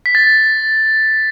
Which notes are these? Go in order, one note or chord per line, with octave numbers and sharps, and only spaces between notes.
B6
A6